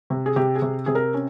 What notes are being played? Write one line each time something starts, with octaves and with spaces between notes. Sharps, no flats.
C3
G#4
C3 G4
G#4
C3
C3 G#4
A#4
C#4